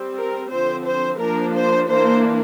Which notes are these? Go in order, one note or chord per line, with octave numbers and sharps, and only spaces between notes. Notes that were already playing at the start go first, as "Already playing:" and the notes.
Already playing: G3 C4
A#4
D3 F3 C4 C5
C5
F3 A#3 D4 A#4
C5
E3 A#3 D4 C5